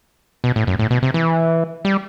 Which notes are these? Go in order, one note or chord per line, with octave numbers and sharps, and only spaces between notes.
B2
A2
F#2
A2
B2
C3
E3
G3